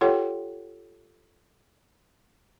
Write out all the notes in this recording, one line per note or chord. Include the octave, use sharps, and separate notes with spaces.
F4 G4 A4 C#5 F#5 G5